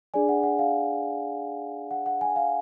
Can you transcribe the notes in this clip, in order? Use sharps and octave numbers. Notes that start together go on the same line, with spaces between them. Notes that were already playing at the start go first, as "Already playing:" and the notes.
D4 G#4 D5 G#5
F#5
F#5
F5
F#5
F#5
G#5
F5